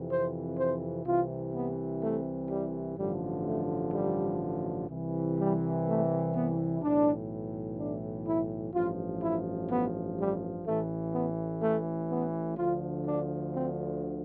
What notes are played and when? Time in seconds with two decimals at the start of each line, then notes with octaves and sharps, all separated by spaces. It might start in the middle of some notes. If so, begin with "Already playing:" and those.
Already playing: F2 C3 E3
0.10 C5
0.57 C5
1.06 C2 C3 E3 F4
1.54 B3
2.02 A3
2.50 G3
2.98 A1 G2 D3 F3 G3
3.46 A3
3.94 G3
4.90 C2 C3 E3
5.38 G3
5.86 A3
6.34 B3
6.82 B1 A2 E3 D4
7.78 D4
8.26 E4
8.74 A1 G2 F3 F4
9.22 E4
9.69 B3
10.18 G3
10.66 A1 A2 E3 A3
11.13 B3
11.62 A3
12.10 B3
12.57 D2 D3 F3 F4
13.05 D4
13.54 C4